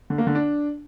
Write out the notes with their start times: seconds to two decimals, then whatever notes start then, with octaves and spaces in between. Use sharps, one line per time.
0.10 D3
0.18 A#3
0.27 D3
0.35 D4